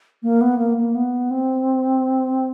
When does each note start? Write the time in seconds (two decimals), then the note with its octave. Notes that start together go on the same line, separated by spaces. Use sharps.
0.23 A#3
0.41 B3
0.59 A#3
0.77 A#3
0.95 B3
1.31 C4